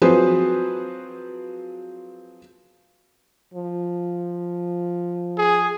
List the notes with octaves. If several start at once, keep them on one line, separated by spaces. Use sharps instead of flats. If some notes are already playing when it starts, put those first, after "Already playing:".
F3 F#3 C4 G#4 B4 C5
F3
G#4